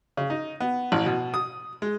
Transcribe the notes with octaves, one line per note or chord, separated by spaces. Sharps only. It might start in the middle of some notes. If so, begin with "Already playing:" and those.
C#3
D#4
B3
A1
B2
D#6
G#3